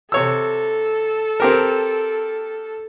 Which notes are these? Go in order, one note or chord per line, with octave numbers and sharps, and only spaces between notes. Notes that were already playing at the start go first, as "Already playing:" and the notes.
C3 A4 C#5 E6
C4 G4 A#4